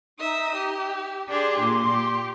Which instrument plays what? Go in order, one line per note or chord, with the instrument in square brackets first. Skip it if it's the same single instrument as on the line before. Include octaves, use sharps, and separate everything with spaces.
[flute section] D#4 [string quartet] E5 D#6
[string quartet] G4
[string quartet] D4 G4 G#4 [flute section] C6 D6
[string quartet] A#2
G4